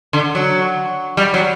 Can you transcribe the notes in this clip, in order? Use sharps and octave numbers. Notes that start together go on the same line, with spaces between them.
D3
F#3
G3
F#3